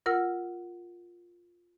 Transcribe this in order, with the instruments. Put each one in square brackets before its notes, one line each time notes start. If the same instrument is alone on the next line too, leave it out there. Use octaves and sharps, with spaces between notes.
[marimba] F4 A#4 F#5 E6 F6